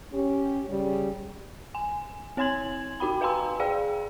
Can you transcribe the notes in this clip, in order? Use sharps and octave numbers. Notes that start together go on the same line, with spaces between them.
C#4 G4
C#3 G3
G#5
C4 C#5 G#5 C6 G#6 F#7
D#4 F#4 G5 B5
B4 F5 G#5 A#5 C6 E6
G#4 D5 F5 G5